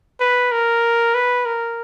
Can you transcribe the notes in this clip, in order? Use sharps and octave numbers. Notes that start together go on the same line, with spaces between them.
B4
A#4
B4
A#4